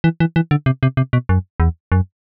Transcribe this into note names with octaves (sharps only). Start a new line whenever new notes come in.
E3
E3
E3
D3
C3
C3
C3
B2
F#2
E2
F#2